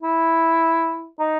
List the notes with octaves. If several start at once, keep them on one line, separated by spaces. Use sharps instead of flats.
E4
D#4